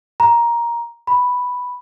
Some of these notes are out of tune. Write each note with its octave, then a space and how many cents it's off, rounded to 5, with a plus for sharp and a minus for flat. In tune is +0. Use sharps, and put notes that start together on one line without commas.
A#5 +10
B5 +0